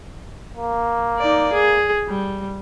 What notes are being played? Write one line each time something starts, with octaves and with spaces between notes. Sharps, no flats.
A#3
D#4 D5
G#4
G3